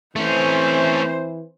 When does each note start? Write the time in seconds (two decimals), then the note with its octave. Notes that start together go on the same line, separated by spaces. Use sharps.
0.16 E3 A3 C4 C#4 C5